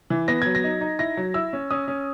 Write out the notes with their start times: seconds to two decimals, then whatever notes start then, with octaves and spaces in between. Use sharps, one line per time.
0.10 E3
0.28 B3 A#6
0.42 F#3 G#6
0.55 A#6
0.64 D#4
0.81 D#4
0.99 E4 A#6
1.17 F#3
1.34 E4 E6
1.53 C#4
1.71 C#4 D#6
1.88 C#4